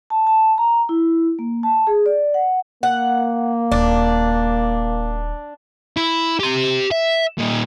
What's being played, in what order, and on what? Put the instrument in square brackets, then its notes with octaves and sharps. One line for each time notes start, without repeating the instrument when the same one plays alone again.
[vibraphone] A5
A5
A#5
E4
A#3
A5
G#4
D5
F#5
[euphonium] A#3 [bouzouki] F#5
[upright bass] D#1 [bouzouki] D4
[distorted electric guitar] E4
G4 C6
E5
A#2 D#4